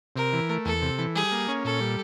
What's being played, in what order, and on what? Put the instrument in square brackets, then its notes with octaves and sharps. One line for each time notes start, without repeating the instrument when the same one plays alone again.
[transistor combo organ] C3 [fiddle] A#4
[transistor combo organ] E3
A3
[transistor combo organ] E2 [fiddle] A4
[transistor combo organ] C3
E3
[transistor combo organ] G3 [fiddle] G#4
[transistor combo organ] A#3
C#4
[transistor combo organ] A#2 [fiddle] A4
[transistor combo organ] G3